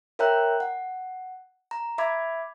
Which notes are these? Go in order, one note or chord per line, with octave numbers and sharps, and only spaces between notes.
A#4 C#5 E5 G5 A#5 F#6
F#5
A#5
E5 B5 D6 G#6